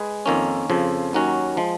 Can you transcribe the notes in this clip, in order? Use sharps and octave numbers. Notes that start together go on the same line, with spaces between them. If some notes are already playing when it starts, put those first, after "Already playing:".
Already playing: G#3 G#4 B4
F2 D#3 A#3 C#4
F2 C#3 F3
D#2 D#3 F#3 C#4 F#4
F3 G#3